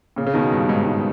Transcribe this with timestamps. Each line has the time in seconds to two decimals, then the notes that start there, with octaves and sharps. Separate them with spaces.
0.16 A#2 C#3
0.26 C#3
0.34 B2 D#3
0.52 G2
0.69 G#2
0.86 G#2